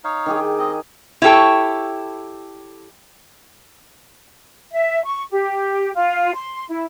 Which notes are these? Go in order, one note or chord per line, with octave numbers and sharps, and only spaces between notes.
D#4 C#5 F5
D#3 G4 G#4
C4 D#5
E4 G4 A4 C#5 G5 C#6
E5
C#6
G4
F4
C6
E4